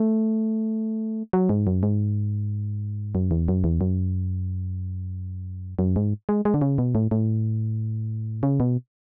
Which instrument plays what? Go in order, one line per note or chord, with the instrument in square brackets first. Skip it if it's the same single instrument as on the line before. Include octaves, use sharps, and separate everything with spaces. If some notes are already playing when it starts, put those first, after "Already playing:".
Already playing: [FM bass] A3
F#3
G#2
F#2
G#2
F#2
E2
F#2
E2
F#2
F#2
G#2
G#3
G#3
D3
C#3
B2
A2
A2
C#3
B2